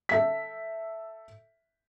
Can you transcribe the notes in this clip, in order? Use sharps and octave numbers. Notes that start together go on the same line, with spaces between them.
A4 E5 B6